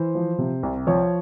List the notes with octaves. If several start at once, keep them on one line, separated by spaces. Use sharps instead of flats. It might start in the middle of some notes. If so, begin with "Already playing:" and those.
Already playing: E3 C5
F3
C3
C2
F3 C#5